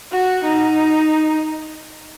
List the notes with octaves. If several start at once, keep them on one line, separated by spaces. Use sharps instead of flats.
F#4
D#4